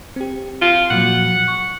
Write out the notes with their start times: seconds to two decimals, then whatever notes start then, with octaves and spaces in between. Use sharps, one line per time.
0.16 C4 G4
0.62 F4
0.91 A#2 F3 F#3 F#5
1.48 C#6